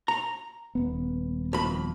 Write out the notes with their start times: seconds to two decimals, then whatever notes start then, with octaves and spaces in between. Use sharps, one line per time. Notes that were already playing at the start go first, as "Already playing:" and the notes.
0.08 A#5
0.75 D#1 B3
1.53 F2 B5